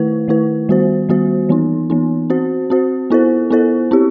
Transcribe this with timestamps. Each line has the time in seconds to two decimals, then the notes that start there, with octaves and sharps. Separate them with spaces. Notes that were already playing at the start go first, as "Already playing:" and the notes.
Already playing: D#3 A3 E4 B4
0.28 D#3 A3 E4 B4
0.69 D#3 G3 B3 F#4 C5
1.09 D#3 G3 B3 F#4 C5
1.49 E3 B3 D#4
1.90 E3 B3 D#4
2.30 C4 F#4 C5
2.70 C4 F#4 C5
3.10 B3 E4 A4 C5
3.50 B3 E4 A4 C5
3.91 C4 E4 G4